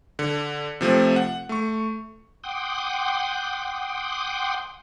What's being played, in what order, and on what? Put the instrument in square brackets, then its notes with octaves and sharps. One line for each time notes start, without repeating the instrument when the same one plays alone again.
[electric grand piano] D3
C3 F3 A3 C4
F#5
A3 C#6
[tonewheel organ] F#5 G5 C6 D6 D#6